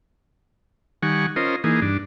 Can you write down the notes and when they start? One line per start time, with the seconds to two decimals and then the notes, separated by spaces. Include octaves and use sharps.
1.03 D#3 G3 F#5 G#5 C#6
1.36 C#4 F4 A#4 C5 D#5
1.64 E3 A#3 D#4 G#4
1.82 G2 D4